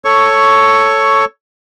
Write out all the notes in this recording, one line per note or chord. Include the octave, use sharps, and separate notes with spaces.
A4 C#5 C#6